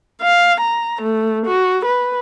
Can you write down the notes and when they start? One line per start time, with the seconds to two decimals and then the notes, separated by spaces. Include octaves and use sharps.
0.22 F5
0.61 A#5
1.02 A3
1.46 F#4
1.86 B4